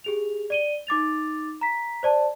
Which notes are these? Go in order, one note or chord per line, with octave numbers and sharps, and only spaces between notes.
G4 G#4 F7
D5 D#7 G7
D#4 D6 A6 F7
A#5 B6
C5 D5 A5